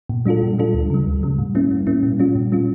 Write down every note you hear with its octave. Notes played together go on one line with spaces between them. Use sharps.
A#2
G3 D4 F4 A4
A#2
G3 D4 F4 A4
D2
C#3 G3
D2
C#3 G3
A2
G3 A#3 C#4 E4
A2
G3 A#3 C#4 E4
A#2
G3 C#4 F4
A#2
G3 C#4 F4